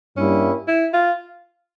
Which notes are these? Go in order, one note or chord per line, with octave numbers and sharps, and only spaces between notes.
G2 G3 A#3 C#4 E4
E4
F4